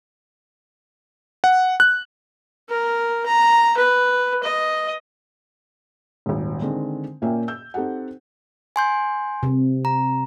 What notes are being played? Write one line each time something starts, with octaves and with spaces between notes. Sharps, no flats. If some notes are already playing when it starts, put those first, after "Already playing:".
F#5
F#6
A#4
A#5
B4
D#5
D#1 G#1
D3 D#3 G#3 C4
A#2 A#3 C#4 E5 G5
E6 G6
C4 D#4 G4 A4 F#5
G#5 C6 G6
C3
A#5